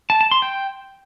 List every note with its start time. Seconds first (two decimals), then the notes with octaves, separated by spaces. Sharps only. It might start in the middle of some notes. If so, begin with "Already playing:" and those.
0.10 A5
0.21 A5
0.31 C6
0.42 G5